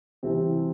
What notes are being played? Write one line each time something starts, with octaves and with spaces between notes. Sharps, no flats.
C2 C3 E3 C4 G4